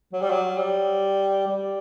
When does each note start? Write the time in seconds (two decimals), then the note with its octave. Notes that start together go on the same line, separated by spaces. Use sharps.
0.13 F#3
0.21 G3
0.30 F#3
0.58 G3
1.47 G3